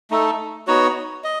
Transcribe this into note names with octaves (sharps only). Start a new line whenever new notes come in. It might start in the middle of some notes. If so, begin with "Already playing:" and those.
A3 D#4 A4
B3 D#4 F#4 C#5
D#5